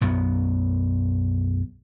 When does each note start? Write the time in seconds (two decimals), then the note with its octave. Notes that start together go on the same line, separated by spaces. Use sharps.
0.01 B1 F#2 B3